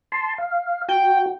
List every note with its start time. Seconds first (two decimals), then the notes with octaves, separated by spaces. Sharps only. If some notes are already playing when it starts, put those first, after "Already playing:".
0.12 A5 C6
0.38 F5
0.88 F#4 G5